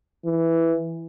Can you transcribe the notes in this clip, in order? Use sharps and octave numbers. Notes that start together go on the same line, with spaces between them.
E3